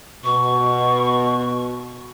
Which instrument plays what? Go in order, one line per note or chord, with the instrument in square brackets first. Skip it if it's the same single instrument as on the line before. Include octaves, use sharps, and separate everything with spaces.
[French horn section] B2 [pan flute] C#6